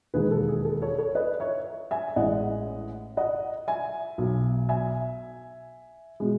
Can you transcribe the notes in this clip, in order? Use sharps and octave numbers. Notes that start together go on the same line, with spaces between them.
E1 D#2 D#3 G#3 G#4 B4
A4
G#4
A4
A4 C#5
A4 C#5
B4 D#5
C#5 E5
E5 G#5
A1 A2 E3 G#3 D#5 F#5
D#5 F#5
E5 G#5
B1 B2 F#3
E5 G#5
B2 G#3